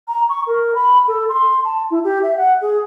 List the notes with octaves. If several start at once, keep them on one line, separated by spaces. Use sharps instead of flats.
A#5
C#6
A#4
B5
A4
C6
A5
E4
G4
E5
F#5
G#4